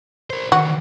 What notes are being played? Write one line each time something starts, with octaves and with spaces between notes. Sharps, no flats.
A#4 C5
D3 D#3 F#4